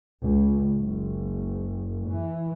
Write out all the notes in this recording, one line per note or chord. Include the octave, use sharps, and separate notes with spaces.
C#2
F#1
E3